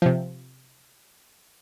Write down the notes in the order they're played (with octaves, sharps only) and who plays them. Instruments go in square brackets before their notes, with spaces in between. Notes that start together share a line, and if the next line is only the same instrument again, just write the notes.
[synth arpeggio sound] C3 F3